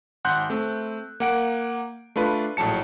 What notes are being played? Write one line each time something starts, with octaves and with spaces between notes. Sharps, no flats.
G#1 F#5 C6 F#6 G6
A3 C4
A#3 F#5 D7
A3 D4 F4 B4
A#1 A2 F#3 A5 C#7